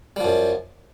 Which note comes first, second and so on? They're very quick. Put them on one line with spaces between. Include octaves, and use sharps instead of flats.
G3 F3 F#2